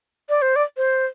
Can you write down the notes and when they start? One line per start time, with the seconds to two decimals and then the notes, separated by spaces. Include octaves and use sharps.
0.29 D5
0.42 C5
0.56 D5
0.77 C5